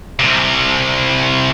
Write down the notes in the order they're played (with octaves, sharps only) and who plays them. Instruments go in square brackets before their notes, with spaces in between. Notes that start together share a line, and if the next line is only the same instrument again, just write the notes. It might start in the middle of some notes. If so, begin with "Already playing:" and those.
[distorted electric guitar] C2 C3